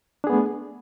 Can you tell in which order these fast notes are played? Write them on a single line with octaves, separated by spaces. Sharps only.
D4 G#4 B3 A3